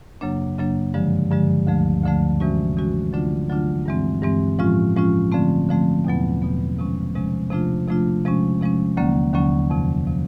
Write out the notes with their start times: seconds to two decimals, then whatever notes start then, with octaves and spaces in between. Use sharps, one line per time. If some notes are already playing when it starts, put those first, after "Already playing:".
0.21 F#2 C#3 F#3 A#3 D4
0.58 F#2 C#3 F#3 A#3 D4
0.94 G2 D3 F3 G#3
1.30 G2 D3 F3 G#3
1.67 D2 D3 F3 A3
2.04 D2 D3 F3 A3
2.40 C3 E3 G#3 C#4 F#4
2.77 C3 E3 G#3 C#4 F#4
3.13 D3 F#3 A3 D4 F4
3.50 D3 F#3 A3 D4 F4
3.86 G2 E3 G#3 C4
4.23 G2 E3 G#3 C4
4.59 A2 F3 G#3 C#4 F4
4.96 A2 F3 G#3 C#4 F4
5.32 D3 F3 A3 C4
5.69 D3 F3 A3 C4
6.05 E2 B2 F#3 B3
6.42 E2 B2 F#3 B3
6.79 C3 F3 G#3 C#4
7.15 C3 F3 G#3 C#4
7.51 C3 F3 A3 D4 F4
7.88 C3 F3 A3 D4 F4
8.25 C3 F3 G#3 C#4
8.61 C3 F3 G#3 C#4
8.97 D#2 D3 F#3 A#3 C#4
9.33 D#2 D3 F#3 A#3 C#4
9.70 F2 C3 F3
10.07 C3 F3